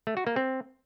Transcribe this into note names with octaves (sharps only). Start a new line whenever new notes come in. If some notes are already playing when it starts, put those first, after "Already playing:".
A3
F#4
A#3
C4